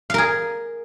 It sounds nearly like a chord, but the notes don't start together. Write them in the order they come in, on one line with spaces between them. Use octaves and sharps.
F5 A#4 G#4